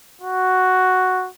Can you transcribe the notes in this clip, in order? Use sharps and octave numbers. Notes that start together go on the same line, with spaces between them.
F#4